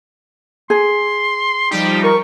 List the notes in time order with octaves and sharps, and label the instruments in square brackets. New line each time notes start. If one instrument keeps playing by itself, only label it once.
[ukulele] G#4 [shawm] C6
[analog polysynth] F3 G3 D#4 [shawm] G4
[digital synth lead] A#4 [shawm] C#6